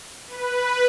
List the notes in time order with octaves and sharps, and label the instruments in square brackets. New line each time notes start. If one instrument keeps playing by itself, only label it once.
[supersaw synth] B4